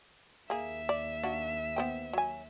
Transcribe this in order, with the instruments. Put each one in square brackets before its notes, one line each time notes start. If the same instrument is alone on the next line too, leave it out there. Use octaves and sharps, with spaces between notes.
[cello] D#2 E5 [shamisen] A#3 G#4
[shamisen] D5
A#3 D4 F#4
B3 C5 G5
F#3 G#5